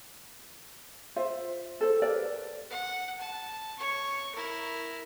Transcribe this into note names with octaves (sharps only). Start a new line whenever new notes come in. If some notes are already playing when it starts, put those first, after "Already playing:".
F4 C5 E5
A4 C5
G4 A#4 B4 D5
F#5
A5
C#5 C#6
E4 A#4